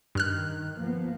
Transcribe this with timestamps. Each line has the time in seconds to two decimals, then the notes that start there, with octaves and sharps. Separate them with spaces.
0.15 G2 D#3 F6 F#6
0.77 F3 A#3 B3